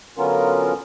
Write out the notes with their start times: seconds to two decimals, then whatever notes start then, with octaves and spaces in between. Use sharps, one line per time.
0.18 D3 F#3 B3 C#4 F4 A#4